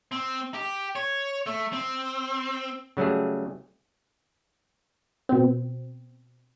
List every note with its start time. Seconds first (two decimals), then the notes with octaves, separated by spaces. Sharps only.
0.12 C4
0.54 G4
0.96 C#5
1.46 A3
1.73 C4
2.97 C#3 F#3 G3 A3 G#4
5.29 B2 C4